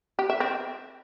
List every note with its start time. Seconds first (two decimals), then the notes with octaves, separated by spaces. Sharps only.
0.19 G4
0.30 E5
0.40 C4